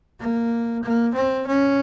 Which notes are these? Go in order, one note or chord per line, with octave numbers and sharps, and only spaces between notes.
A#3
A#3
C4
C#4